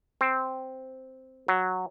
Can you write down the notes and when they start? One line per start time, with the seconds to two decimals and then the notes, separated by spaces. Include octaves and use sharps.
0.21 C4
1.48 F#3